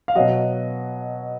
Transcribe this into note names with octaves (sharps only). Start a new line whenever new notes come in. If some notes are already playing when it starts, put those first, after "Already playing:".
F5
B2 F#3 D#5 F#5